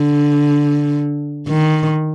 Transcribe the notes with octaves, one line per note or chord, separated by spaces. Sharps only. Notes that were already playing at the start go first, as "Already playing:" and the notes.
Already playing: D3
D#3